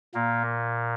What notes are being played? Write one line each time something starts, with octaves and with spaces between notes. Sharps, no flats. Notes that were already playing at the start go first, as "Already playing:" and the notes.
A#2 A#3